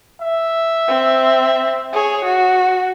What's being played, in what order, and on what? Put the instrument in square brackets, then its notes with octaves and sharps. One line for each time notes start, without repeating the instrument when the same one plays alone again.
[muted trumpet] E5
[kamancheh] C4
G#4 C#5
F#4